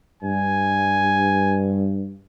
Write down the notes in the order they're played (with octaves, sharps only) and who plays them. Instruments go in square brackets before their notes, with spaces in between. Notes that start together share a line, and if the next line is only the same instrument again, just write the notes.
[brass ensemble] G2 [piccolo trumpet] G#5